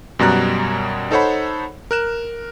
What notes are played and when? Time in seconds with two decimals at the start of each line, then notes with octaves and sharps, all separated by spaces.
0.19 F#2 B2 G3 A#5 F#6
1.11 D#4 A4 C5 C#5 F#5 B5
1.91 A#4 F#6 E7